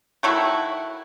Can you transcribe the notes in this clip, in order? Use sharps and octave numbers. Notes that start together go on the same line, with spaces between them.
D#3 A3 E4 F#4